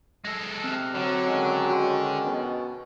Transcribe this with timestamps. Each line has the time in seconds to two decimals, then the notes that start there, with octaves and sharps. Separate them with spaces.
0.25 G#3 A4 A#6
0.64 C3 C4 F6 F#6
0.95 D3 F#3
1.26 D#3 G#3 C#4
1.70 F#4 C6
2.25 B2